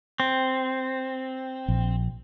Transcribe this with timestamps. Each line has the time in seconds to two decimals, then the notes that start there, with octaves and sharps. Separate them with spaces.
0.20 C4
1.68 A#1